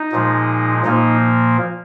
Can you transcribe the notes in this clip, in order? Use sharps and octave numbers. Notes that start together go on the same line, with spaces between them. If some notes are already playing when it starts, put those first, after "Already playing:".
Already playing: D#4
A#2 F3 G#3
A#2 F3 A#3 D#4